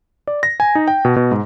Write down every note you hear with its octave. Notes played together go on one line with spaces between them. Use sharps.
D5
A#6
G#5
D#4
G5
B2
B2
G#2